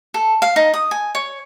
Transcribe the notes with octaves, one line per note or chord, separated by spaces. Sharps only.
A4
F5
D#4
D#6
G#5
C#5